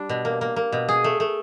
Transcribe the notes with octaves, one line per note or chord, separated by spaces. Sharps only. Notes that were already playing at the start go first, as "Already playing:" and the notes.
Already playing: G3 D4
B2
A#3
A#3
A#3
B2
G#4
A3
A3